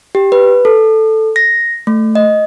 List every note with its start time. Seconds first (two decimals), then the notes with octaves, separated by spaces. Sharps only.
0.15 G4
0.32 B4
0.65 A4
1.36 A#6
1.87 A3
2.15 D#5